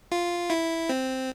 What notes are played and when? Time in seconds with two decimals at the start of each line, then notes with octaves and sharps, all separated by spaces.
0.12 F4
0.50 E4
0.89 C4